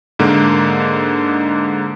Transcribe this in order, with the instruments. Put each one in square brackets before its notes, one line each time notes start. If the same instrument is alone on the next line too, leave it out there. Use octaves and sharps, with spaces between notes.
[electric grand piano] G#2 D3 A#3